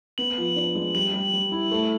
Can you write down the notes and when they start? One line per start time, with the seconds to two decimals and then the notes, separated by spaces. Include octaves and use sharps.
0.18 B3 F#7
0.38 F3
0.56 D4
0.75 G#3
0.95 G3 F#7
1.13 G3
1.33 G3
1.52 E4
1.71 A3